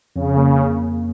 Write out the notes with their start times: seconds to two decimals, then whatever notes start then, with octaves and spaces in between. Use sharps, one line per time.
0.16 F2 C#3
0.37 A#3